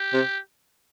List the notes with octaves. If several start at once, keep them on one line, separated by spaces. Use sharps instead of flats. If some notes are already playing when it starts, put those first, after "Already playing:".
Already playing: G4
C3